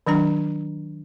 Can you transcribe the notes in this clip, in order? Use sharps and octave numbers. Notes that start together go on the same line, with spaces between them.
D#3 F#3 D4 A#5